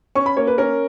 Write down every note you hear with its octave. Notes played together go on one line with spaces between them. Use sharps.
C#4 C#6
B5
A#3 C#5
B4
C#4 A#4